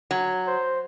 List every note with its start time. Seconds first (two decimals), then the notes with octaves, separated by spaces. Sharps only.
0.11 F#3
0.47 C5